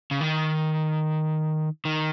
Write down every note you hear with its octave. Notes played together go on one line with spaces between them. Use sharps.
C#3
D#3
D#3